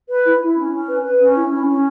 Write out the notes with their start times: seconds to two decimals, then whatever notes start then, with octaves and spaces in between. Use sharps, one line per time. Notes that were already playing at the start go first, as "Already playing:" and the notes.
0.09 B4
0.25 E4
0.41 E4
0.56 C#4
0.73 C#4
0.88 B4
1.03 B4
1.20 C#4
1.35 E4
1.50 C#4
1.67 C#4